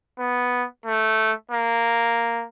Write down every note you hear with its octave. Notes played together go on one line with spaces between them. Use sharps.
B3
A3
A#3